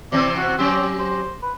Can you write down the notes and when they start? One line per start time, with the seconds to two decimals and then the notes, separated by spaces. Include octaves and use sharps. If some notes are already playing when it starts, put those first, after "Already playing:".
0.12 C3 E3 C4 D5
0.37 F#4
0.59 F#3 C4 C#4 G4
0.99 C5
1.42 B4